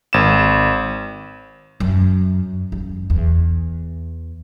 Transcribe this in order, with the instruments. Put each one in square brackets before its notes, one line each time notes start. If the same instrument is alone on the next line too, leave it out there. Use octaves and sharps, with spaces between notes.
[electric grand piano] G#1 E7
[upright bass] F#2
F#2
E2